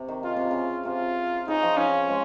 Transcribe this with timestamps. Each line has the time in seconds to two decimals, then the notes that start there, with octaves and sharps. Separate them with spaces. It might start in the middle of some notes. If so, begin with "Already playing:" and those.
Already playing: C3
0.08 D#3
0.23 C#3 F4
0.36 C3
0.51 C#3
0.85 C3 F4
1.48 C#3 D#4
1.63 F3
1.77 F3 C#4
2.08 F3 G#3